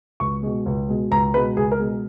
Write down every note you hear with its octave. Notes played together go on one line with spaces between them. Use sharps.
C#2 C#6
B2 G#3
C#2
B2 G#3
C#2 A#5
B2 G#3 B4
C#2 G#4
A#4
B2 G#3